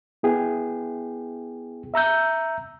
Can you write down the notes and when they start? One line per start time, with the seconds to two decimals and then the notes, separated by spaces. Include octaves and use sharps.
0.23 B3 E4 G#4 G5
1.94 E5 A#5 E6 G6